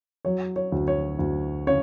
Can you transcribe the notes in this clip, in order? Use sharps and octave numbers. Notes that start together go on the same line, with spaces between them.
F#3 C#5
C#5
D2
C#5
D2
C#3 C#5